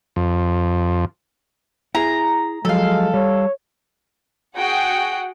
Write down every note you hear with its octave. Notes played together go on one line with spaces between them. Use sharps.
F2
E4 G#4 A#5
F3 F#3 G#3 A4 F5
G3 C#5
F#4 G#4 F#5 G5